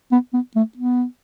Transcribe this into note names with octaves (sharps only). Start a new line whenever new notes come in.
B3
B3
A3
B3